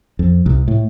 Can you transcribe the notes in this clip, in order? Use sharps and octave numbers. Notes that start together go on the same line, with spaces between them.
F2
C2
A2